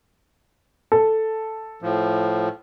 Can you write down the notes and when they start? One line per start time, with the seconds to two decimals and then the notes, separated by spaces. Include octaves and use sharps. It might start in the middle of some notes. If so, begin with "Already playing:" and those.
0.92 A4
1.82 A2 F3